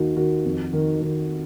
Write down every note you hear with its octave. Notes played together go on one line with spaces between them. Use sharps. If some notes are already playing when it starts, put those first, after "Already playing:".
Already playing: D#2 D#3 F#4
D#3 F#4
F2
D#3
D#3